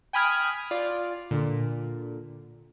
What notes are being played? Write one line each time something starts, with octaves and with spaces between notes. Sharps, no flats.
G5 G#5 B5 D#6 F6 G#6
F4 D5
A#2 D3